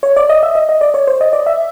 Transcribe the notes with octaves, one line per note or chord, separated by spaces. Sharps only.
C#5
D5
D#5
E5
D#5
D#5
D5
C#5
C5
D#5
D5
E5